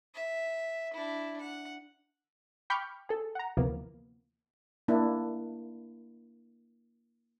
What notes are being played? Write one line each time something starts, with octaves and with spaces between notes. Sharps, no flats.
E5
D4 E4
F#5
G5 B5 C#6 D6 F6 G6
G#4 A4
F#5 A#5
D2 C3 E3 F3 A#3 B3
A#3 D4 E4